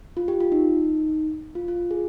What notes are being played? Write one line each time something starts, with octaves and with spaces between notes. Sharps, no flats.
F4
G4
F4
D#4
F4
F4
G#4